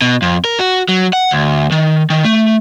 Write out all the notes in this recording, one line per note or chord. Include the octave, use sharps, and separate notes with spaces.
B2
F2
A#4
F#4
F#3
F#5
D2
D#3
D#3
A3